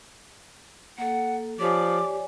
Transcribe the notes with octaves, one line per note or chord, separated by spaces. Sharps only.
A#3 A4 F#5
F3 G4 C#5 D5 G#5 D6